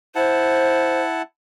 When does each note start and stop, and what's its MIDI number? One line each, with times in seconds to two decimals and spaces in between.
0.16 1.22 64
0.16 1.02 72
0.16 1.22 78
0.16 1.22 81